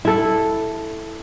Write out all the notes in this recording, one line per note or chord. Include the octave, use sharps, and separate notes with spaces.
E4 A4